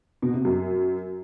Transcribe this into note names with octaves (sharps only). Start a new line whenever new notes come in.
B2
C3
F#2